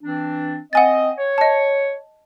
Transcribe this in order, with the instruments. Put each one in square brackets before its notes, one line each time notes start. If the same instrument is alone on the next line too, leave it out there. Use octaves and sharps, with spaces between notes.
[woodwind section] E3 C4 D4
[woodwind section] C4 D#5 [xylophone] F#5 G#5 A6
[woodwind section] C#5
[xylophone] D#5 A5